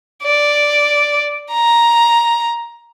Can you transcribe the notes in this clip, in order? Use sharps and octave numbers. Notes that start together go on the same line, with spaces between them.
D5
A#5